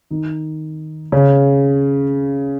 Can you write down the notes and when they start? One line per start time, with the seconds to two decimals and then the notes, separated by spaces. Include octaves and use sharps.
0.11 D#3 D#4
1.12 C#3 C#4